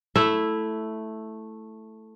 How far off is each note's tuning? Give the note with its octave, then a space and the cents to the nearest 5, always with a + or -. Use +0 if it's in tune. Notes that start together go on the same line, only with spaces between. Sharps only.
A3 +0 E4 +0